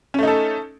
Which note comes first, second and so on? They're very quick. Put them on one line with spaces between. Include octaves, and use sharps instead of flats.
C#4 A3 D#4 A4